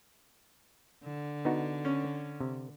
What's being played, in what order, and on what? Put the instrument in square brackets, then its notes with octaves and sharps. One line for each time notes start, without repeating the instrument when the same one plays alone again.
[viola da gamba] D3
[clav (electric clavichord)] B3 D#4 F#4
[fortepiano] C#4
[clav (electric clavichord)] C3